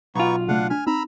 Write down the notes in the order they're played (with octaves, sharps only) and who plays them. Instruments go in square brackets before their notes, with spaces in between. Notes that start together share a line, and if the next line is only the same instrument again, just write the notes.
[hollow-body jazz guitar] B1 F4 [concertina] B3 D#4 C#6 [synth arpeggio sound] G#5 G#6
[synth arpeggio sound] C#3 A3 [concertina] D4 F5 F#5
[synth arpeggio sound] D4 B6 [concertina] G#5 F6
[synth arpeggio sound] C4 D#4 [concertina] A#5 B5 E6